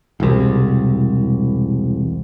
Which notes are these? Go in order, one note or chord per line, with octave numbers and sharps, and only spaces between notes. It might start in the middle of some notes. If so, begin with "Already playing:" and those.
E1 C2